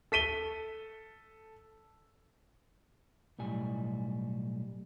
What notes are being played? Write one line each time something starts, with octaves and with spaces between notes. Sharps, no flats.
A4 B6 D#7 G7
B1 A2 G3 G#5